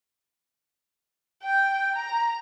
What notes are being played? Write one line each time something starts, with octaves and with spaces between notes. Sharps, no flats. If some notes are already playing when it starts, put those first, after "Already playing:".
G5
A#5